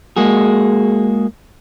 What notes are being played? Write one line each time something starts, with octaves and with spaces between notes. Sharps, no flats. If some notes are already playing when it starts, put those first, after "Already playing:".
G#3 A#3 F#4 G#4